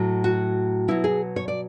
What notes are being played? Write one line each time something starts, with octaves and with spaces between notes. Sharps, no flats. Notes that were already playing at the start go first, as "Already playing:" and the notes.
Already playing: A2 F#3
F#4
B2 F#3 E4
G#4
C#5
D5